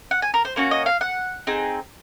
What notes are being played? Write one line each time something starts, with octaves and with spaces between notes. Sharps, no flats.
F#5
G#5
A#4
C5
A#3 C#4 F#4
D#5
F5
F#5
C4 D#4 G#4